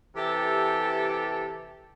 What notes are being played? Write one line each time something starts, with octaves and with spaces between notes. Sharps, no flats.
C3 E3 G4 A4